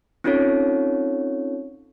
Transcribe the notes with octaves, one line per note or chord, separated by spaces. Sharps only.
C4 C#4 D#4 F4 A4 C#5